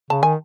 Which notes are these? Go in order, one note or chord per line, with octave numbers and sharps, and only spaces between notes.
C#3 A5
D#3 G#5